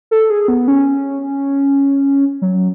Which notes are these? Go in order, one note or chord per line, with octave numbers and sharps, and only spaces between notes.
A4
G#4
B3
C#4
F#3